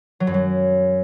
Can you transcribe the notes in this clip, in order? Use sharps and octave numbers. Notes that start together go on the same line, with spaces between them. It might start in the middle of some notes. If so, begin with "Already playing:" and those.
F#3
F#2
F#3